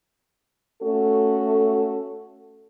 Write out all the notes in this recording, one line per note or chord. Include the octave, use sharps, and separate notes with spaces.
A3 C#4 F#4 A4